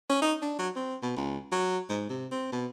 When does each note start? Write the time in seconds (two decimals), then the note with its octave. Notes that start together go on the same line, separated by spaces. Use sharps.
0.10 C#4
0.22 D#4
0.42 D4
0.59 F#3
0.76 C4
1.02 B2
1.16 C#2
1.52 F#3
1.89 G#2
2.09 C3
2.32 C4
2.52 B2